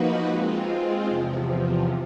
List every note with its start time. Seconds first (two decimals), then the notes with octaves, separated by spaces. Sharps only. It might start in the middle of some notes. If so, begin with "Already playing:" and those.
Already playing: F3 A#3 D#4 F#4 B4
0.29 G#3 C4 F4
1.07 E2 C3 F3